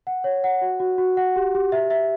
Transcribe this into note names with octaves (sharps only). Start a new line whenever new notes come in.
F#5
C#5
F#5
F#4
F#4
F#4
F#5
G4
G4
E5
E5